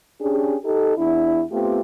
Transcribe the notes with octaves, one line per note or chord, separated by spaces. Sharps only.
C#4 D4 G4 G#4
D#4 G4 A4
E2 D4 E4
A3 B3 C4 F4 G4